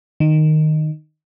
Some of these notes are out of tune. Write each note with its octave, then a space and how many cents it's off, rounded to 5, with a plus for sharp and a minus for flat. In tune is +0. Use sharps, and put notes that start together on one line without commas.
D#3 -10